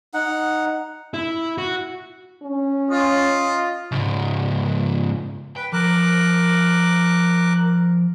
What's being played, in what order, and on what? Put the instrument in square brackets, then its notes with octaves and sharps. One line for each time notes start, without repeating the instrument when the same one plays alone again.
[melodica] D#4 F#5
[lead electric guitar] E4
F#4
[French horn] C#4
[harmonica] F4 D#5
[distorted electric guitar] C#2 G#2
[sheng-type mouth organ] B4 [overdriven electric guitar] G5
[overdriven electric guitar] F3 [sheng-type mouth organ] A#4 D6 F#6